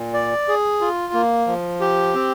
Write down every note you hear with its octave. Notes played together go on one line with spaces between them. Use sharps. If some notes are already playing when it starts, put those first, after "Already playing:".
Already playing: A#2
D5
G#4
F4
A#3
F3
G4
C4